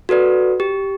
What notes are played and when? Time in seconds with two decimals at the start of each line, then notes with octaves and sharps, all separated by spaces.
0.09 F#4 A4 B4 D5
0.60 G4